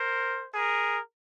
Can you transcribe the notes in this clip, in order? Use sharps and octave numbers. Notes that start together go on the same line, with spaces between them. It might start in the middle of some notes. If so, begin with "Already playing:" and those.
Already playing: A#4 C5
G#4 A#4